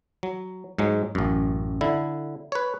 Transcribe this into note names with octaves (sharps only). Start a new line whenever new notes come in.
F#3
G#2 F#3 G#3
A1 F#2
D3 E4
B4 C#5